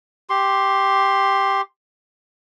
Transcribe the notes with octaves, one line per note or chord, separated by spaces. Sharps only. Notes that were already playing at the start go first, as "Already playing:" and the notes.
G4 C6